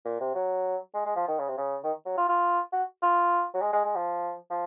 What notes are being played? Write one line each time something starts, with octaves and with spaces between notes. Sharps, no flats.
A#2
C3
F#3
G#3
G#3
F3
D#3
C#3
C3
C#3
D#3
F#3
F4
F4
F#4
F4
F#3
G#3
G#3
G#3
F3
F3